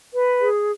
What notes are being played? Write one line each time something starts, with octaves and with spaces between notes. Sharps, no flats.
B4
G#4